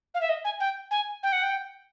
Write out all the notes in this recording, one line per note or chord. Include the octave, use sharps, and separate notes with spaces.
F5
E5
D#5
G#5
G5
G#5
G5
F#5
G5